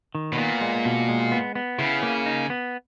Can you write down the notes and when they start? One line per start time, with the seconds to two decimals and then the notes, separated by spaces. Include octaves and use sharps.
0.15 D#3
0.33 B2
0.38 A#2 B3
0.61 G#3
0.85 B2
1.09 G#3
1.32 B3
1.55 B3
1.79 C#3 E4
2.03 A#3
2.26 D#4
2.50 B3